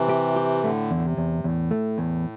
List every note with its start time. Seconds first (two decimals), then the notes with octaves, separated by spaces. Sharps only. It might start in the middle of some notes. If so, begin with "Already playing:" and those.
Already playing: C3 E3
0.09 G4
0.36 G4
0.64 A2 D3 A3
0.91 E2 A2
1.04 C3
1.17 E2
1.44 E2 A2
1.71 A3
1.98 E2